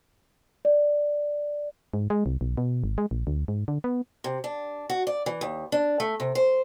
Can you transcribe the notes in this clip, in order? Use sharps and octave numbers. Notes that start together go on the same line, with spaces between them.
D5
G#2
G#3
C2
B1
B2
G#1
G#3
A#1
D2
G#2
D3
B3
C3
D4
F#4
D5
E3
D#2
D4
A3
C3
C5